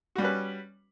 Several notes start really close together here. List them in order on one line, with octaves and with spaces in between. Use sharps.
F#4 G3 C#4 B4